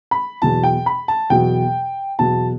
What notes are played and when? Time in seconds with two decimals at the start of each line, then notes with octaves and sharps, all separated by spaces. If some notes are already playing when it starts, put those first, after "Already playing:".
0.11 B5
0.42 E2 B2 F#3 A5
0.63 G5
0.86 B5
1.08 A5
1.30 E2 B2 F#3 G5
2.19 E2 B2 F#3 A5